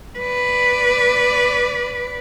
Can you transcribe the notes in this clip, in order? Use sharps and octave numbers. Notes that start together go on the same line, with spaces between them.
B4 D5